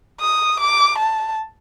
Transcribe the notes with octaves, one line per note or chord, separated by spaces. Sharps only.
D#6
D6
A5